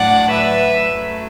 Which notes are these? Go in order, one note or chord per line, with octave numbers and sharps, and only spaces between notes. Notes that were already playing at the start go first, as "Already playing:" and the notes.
Already playing: A2 F#3 D4 D5 F#5
B4 E5
F#2 F#3 A3